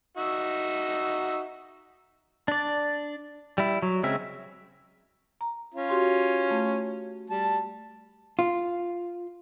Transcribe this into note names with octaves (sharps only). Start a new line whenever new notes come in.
D#4 F#4 E5
D4 D5
G3 E4
F#3
C#3 G#3 C4 C#4 E5
A#5
C#4 F4
F#4 G4 C6
A3
G3 A5
F4